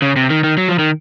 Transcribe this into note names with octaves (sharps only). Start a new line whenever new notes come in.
C#3
C3
D#3
D#3
F#3
F3
D#3